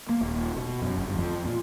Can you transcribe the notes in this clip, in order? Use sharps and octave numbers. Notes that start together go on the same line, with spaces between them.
A#3
D#1
B2
F#2
G1
F2
A#2